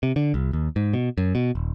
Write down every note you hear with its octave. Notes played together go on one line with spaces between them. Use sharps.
C3
D3
C2
D#2
G#2
B2
F#2
B2
D#1